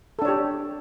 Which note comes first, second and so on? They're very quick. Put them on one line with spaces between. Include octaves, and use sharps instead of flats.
A4 D4 C#5 G4